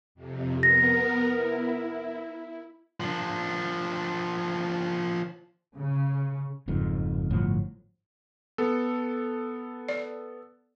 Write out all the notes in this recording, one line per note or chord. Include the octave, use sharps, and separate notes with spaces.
F2 C3
B3 A#4 A#6
E4
F3 D4
C#3
F#1 F2 G#2
G1 A2 F3 F#3
B3 A4
D5